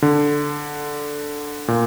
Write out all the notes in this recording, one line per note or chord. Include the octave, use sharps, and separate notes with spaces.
D3
A#2